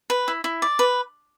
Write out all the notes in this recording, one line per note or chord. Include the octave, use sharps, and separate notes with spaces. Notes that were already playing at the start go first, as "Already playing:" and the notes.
B4
E4
E4
D5
B4